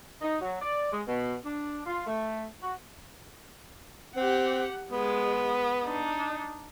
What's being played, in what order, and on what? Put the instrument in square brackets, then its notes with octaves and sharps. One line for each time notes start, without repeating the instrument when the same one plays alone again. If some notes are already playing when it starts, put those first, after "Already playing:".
[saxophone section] D#4
F#3
D5
G#3
B2
D4
F4
A3
F#4
[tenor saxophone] C4 [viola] G4 F#5
[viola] G#3 [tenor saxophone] B3
[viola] D4 D#4